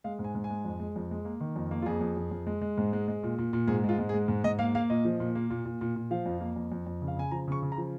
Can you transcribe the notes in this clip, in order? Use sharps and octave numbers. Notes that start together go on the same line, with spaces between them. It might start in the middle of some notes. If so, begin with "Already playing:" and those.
G#3 F5
G#2
G#5
G#2
G#5
G#3
F2
G#3
F2
G#3
A#3
D#3
F2
A#3
F4
F2 G#4
F2
F2
F2
G#3
G#3
G#2
G#3
G#3
A#2
A#2
A#2
G#2 G#4
G#3
F4
G#2
G#4
G#3
G#2
G#2 D#5
A#3 F5
A#3 F5
A#2 D#5
F3
A#2
A#3
A#2
A#2
A#2
A#2
F3 F5
F2
A#3
F2
F2
F2
C#3
F5
C#3 G#5
F3 A#5
C#3 C#6
C#3
A#5
F3